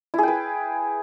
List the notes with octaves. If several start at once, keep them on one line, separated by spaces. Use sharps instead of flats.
E4 G#4 B4 G5